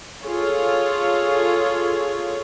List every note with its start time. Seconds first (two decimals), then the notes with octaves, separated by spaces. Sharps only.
0.23 F4 G#4 A4 C#5